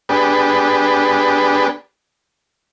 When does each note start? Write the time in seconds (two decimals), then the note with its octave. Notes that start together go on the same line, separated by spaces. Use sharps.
0.09 B3 D4 G4 G#4 B4